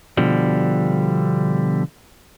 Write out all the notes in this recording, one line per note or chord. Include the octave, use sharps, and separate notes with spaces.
B2 D3 F3 G3